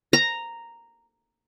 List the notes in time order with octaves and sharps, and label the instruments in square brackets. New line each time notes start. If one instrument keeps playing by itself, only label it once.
[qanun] A#5